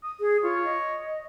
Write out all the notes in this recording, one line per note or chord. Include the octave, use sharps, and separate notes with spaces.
D#6
G#4
F4 C#5
D#5